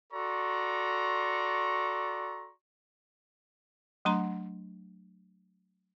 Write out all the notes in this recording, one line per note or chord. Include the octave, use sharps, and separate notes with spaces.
F#4 A4 D5 A#5 C6 C#6
F#3 A3 D4 F#5 A#5 C6